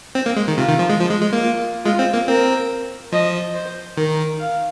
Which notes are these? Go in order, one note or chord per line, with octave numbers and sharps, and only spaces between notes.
C4
A#3
G#3
D#3
C3 F4
D#3
F3
G#3
F3
G#3
G#3
A#3
F4
G#3 F4
C4
A#3
C4 A#4
F3 D#5
C5
D#3 A#4
F5